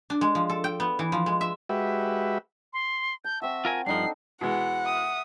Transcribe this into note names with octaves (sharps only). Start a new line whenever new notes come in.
D4
G#3
F3
A4
G5
B3
E3
F3
G#3
E5
G#3 F#4 G4 B4 E5
C6
A5 G6
C4 F#4 E5
F4 A#4 G#5
G2 F3 D4 D#4 A4 C7
B2 E3 G#3 F#5
E5 D#6